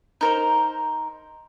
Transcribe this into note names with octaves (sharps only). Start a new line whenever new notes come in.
D#4 A#4 C5